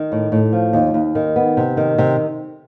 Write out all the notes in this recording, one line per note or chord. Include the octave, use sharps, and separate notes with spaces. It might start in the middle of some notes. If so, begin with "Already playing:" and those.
Already playing: D#3
A2
A2
F3
D#2
D#2
D#3
B3
C3
D#3
C3